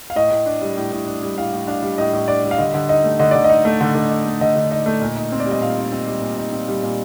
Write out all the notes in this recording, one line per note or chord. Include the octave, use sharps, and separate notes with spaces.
F5
A2 D#5
A2
D4
G3
A2
A2
D4
G3
A2 F5
A2
D4 F5
G3
A2 D#5
A2
D4 D5
G3
F5
D3 D#5
D3
D#4 D#5
A3
D3 D#5
D3 D5
D#5
D#4
A3
D3
D3
D#4
A3
D3 D#5
D3
D#4 D#5
A3
A#2
D#4
C4
D5
G3
D#5
A#2 F5
D#4
C4
G3
A#2
D#4
C4
G3
A#2